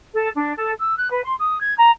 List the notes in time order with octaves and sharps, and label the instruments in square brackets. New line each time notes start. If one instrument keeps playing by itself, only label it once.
[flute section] A4
D4
A4
E6
F#6
B4
C6
D#6
G#6
A#5